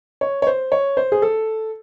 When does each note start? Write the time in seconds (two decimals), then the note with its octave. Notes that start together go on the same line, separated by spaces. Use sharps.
0.21 C#5
0.42 C#5
0.47 C5
0.72 C#5
0.97 C5
1.12 G#4
1.22 A4